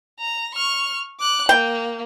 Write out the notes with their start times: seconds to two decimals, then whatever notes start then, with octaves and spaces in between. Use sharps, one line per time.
0.20 A#5
0.55 C#6 F6
1.20 D6 F#6
1.49 A#3 G5